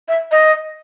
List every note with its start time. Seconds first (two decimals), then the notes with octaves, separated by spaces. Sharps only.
0.08 E5
0.31 D#5